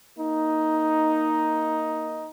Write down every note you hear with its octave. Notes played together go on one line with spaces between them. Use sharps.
A#3 D#4